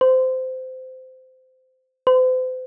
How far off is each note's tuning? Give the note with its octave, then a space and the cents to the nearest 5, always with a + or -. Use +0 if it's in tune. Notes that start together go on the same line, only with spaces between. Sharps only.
C5 -20
C5 -40